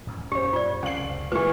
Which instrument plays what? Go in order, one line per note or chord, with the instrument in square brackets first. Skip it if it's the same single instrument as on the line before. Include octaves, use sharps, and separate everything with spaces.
[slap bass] E2 G#2 C#4
[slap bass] B1 F#2 A#2 [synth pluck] C#4 C5 [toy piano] G4
[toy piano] F4 D5
[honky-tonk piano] F#1 F#7 [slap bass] C#2 C3 [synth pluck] F5 C7
[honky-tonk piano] A#2 E3 [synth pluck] F4 G#4 [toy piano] G4 B4